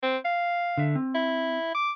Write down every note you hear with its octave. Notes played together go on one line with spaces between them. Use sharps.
C4
F5
D3 E5
C4
E4
D6